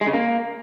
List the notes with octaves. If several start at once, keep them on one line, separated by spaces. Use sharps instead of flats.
G#3
C#3
A#3